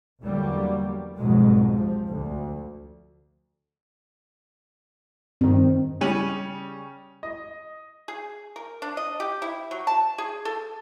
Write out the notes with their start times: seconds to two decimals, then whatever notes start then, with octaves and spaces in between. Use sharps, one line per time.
0.21 E2 D3 F#3 G3 A#3
1.17 C2 F2 G#2 B2 F#3 G#3
1.71 C3 F3
2.08 D2
5.41 G2 D#3 C4
6.01 C#3 G3 C#4 D#7 F7 F#7
7.23 D#5
8.08 G#4
8.56 A#4
8.82 D4
8.97 D#5
9.20 G4
9.42 E4
9.71 F#3
9.87 A5
10.18 G#4
10.45 A4